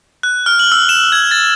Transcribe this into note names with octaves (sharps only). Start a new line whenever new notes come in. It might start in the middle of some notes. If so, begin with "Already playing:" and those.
F#6
F6
F#7
E6
E7
G#6
A6